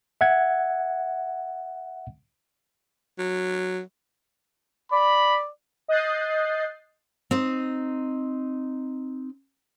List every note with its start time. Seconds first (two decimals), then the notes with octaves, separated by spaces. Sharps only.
0.21 E5 F#5 G#6
3.19 F#3
4.92 D5 B5
5.88 D#5 D#6 F#6 G6 A6 C7
7.31 C4 D#4